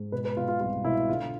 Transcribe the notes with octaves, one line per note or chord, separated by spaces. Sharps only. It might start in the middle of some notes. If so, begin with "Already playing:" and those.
Already playing: G#2
B2 B4
B4
B2 F4
F4
C2 F4
B2 E4
D3 F4